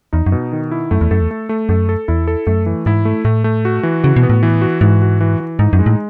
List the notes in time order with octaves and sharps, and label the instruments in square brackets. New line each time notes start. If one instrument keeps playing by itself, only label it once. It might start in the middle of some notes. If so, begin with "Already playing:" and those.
[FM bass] E2 [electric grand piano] D#4
[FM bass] F#2
[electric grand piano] B2
D#3
E4
[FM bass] F#2 [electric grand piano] A3
[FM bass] E2
[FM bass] F#2 [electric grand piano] A4
[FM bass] E2
[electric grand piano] A3
A3
[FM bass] F#2 [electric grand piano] A4
[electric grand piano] A4
[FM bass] E2 [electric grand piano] E4
[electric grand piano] A4
[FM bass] F#2 [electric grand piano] A3
[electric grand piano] E3
[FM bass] G#2 [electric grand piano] E4
[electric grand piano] A3
[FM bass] A2 [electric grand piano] A3
[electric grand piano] A3
F#4
E3
[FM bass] C#3 [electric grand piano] F#4
[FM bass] B2
[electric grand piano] B3
[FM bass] A2
[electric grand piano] E3
F#4
[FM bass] G#2 [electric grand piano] E3
[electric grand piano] F#4
E3
E3
[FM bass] G#2 [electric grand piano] D#4
[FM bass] F#2
[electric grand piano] G#3
[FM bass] A2